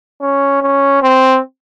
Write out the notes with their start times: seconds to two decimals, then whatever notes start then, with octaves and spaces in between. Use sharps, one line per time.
0.21 C#4
0.62 C#4
1.02 C4